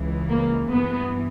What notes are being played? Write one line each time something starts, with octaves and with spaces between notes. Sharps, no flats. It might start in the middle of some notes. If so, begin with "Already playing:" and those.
Already playing: C#2 C#3 E3
A#3
G2 E3 B3